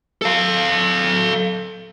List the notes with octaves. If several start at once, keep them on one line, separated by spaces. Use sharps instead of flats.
A4 F5